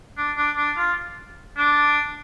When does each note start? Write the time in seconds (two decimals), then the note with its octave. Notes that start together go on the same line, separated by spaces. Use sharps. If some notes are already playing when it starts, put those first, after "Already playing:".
0.17 D4
0.37 D4
0.57 D4
0.77 F4
1.57 D4